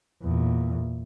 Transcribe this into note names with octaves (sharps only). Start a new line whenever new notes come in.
E2 A#2